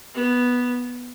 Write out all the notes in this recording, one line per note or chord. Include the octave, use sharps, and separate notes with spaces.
B3